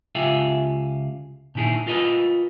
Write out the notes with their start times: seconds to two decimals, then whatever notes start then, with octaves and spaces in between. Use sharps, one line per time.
0.15 C#2 F4 G4 G#4 E5
1.55 A#2 D#3 E4 G#4
1.87 F4 A#4 B4 D#5